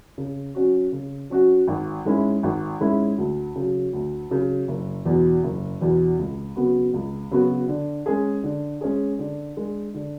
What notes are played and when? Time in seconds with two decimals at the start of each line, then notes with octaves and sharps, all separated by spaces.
0.18 C#3
0.55 F#3 C#4 F#4
0.92 C#3
1.30 F#3 C#4 F#4
1.68 G#1
2.05 G#2 G#3 C#4 E4
2.43 G#1
2.81 G#2 G#3 C#4 E4
3.18 D2
3.56 C#3 F#3
3.93 D2
4.30 C#3 F#3
4.68 F#1
5.06 E2 B2
5.44 F#1
5.81 E2 B2
6.19 C#2
6.56 C#3 F#3 B3 F#4
6.94 C#2
7.31 C#3 F#3 B3 F#4
7.68 D3
8.06 G#3 C#4 G#4
8.44 D3
8.81 G#3 C#4 G#4
9.19 D3
9.57 G#3 D4
9.94 D3